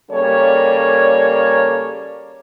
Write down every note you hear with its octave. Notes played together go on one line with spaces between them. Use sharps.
C#3 G3 A#3 A4 C#5 D5